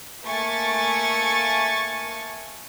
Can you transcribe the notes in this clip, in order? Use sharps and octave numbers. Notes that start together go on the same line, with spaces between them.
A3 A#3 G#5 C#6 A6